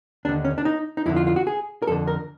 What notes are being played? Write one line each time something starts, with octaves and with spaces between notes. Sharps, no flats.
D#2 D3 D4
C#4
D4
D#4
D#4
F2 D3 E4
F4
F4
F#4
G#4
A#4
F2 D3 A4
A#4